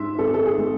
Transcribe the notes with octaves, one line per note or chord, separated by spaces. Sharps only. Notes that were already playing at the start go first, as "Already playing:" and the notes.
Already playing: G#2 E5 C6
G#1 A4
A4
G#4
A3